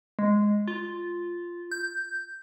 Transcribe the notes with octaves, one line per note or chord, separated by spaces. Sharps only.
G#3
F4
G6